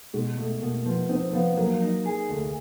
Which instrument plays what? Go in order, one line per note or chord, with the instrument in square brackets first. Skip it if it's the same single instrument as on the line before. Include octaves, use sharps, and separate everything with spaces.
[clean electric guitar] B2 [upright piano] G#3
[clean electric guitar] B2 [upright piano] A3
[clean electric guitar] B2 [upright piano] A#3
[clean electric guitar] F3 [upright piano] B3
[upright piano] C4 [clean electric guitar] D#4
[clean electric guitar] F3 [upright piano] B3
[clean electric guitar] F#3 [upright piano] A#3
[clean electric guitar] D#4
G#4
[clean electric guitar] D2 [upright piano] A3